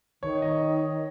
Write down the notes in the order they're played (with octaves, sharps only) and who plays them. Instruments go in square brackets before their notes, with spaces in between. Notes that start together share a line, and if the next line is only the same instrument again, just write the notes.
[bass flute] D#3 [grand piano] C#5
[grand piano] D#5